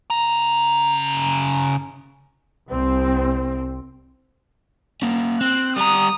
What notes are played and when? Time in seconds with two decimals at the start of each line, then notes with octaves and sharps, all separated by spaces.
0.10 C#3 A#5
2.71 C2 C4
5.02 A#3 C#4
5.41 C4 F#6
5.76 G3 A#5 D#6